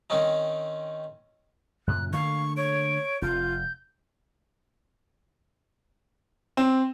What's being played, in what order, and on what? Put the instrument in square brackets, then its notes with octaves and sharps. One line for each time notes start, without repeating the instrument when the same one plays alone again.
[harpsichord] D#3 C4 C#4 D#4
[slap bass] F#2 A#2 C#3 [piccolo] F#6
[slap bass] D3 A3 A#3 [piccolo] F5 [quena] C#6
[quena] C#5 [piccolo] D7
[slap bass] F1 [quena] F4 [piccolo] G6
[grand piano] C4